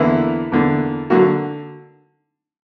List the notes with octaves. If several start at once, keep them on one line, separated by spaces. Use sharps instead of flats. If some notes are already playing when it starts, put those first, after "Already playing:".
Already playing: E2 D3 E3 A#3 E4
E2 D3 A#3
D3 F#3 A#3 F#4